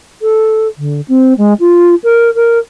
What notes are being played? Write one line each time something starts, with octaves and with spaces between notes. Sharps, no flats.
A4
D3
C4
G#3
F4
A#4
A#4